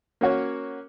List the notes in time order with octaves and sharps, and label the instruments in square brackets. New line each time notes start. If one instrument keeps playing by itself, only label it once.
[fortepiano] A#3 C#4 F#4 C#5